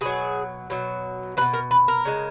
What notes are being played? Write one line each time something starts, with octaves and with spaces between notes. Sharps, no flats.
B2 F#3 G#4
B2 F#3
F#3 B4
B2
A#4
B4
A#4
C#3 G#3